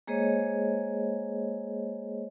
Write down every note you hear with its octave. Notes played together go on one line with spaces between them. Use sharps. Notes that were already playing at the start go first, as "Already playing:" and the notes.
G#3 A#3 G#4 C5 C#5 D#5